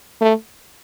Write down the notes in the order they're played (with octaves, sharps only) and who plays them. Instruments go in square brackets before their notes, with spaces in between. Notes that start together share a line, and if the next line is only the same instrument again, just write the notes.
[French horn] A3